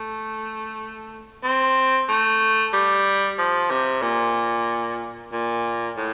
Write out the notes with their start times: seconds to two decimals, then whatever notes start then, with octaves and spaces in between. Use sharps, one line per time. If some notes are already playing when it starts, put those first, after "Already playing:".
Already playing: A3
1.44 C4
2.09 A3
2.73 G3
3.38 F3
3.71 C3
4.02 A#2
5.32 A#2
5.97 A2